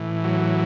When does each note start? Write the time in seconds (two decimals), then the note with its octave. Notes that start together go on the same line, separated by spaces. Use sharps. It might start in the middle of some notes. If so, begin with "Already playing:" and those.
Already playing: A2 E3
0.24 F#3